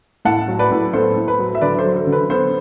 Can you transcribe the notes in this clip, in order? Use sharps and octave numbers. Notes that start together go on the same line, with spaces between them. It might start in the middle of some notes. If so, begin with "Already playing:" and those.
A2 F#5 A5
F#3
B4 D5
A2
B3 A4 C5
A2
B4
F#3
E5
D3 B4 D5
A4 C5
F#3
A4
D3
B4
B3 A4 C5